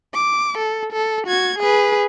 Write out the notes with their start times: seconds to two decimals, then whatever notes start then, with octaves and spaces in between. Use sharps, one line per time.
0.15 D6
0.58 A4
0.93 A4
1.27 F#4 G#6
1.59 G#4 B4